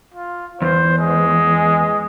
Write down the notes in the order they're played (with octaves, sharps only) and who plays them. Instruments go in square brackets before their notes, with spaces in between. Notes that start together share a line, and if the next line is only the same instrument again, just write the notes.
[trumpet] F4
[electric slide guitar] E2 [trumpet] C5
[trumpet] G#3